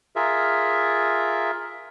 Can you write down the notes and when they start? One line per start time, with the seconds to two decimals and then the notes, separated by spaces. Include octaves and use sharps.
0.16 F4 G#4 A#4 E5